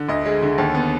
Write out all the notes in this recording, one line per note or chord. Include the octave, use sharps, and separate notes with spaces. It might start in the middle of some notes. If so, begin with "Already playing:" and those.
Already playing: D3
D2 D#5
G#3
D3
D#2
B3